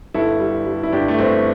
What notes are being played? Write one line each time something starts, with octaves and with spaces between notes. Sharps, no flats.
G1 E4 A4
G3
G3
E4
G1 D4 G4
A3
G1 C4